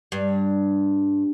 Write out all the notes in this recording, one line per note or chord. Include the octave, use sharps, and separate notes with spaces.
G2